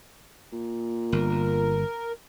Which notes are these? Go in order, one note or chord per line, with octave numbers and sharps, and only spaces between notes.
A#2
G1 A#4